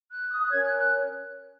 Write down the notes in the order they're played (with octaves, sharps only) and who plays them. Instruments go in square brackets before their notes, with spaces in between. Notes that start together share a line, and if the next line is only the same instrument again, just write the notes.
[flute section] F#6
D#6
F#6
C#4 A#4 C#5 G#6
F#6
F#6